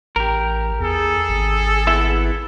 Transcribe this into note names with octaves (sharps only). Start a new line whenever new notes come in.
A1 G4 A#4
E2 G#4 A4
G#1
B3 E4 E5